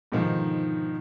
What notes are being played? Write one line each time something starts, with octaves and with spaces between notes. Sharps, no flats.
G#2 B2 D3 D#3 F3